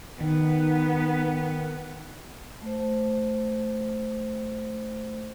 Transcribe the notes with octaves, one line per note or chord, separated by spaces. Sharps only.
D#3 B3 D#4
A3 C5